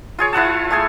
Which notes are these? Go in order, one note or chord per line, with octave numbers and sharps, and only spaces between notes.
F4 G#4 C#5
E4 F4 F#5 A5
A3 G#4 A4 G#5